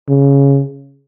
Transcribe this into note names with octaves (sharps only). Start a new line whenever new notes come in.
C#3